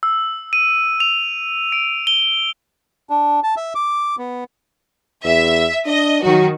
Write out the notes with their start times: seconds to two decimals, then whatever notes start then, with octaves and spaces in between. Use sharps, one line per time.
0.03 E6
0.53 D#7
1.00 F7
1.72 D7
2.07 G7
3.10 D4
3.43 A5
3.57 E5
3.75 D6
4.18 B3
5.25 E2 E5
5.86 D4 D#5
6.23 D#3 F#3 F#4